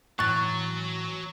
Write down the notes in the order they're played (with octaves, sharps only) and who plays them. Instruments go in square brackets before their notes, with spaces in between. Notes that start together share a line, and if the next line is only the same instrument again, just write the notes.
[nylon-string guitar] A2 E3 [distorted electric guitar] F#3 [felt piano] C#6 [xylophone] F#6 A6